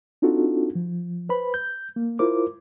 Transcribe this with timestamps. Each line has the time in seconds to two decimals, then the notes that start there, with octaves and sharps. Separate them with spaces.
0.22 C4 D4 D#4 F4 F#4 A4
0.75 F3
1.29 B4 C5 B5
1.54 G6
1.96 A#3
2.19 E4 F4 A#4 C5 D6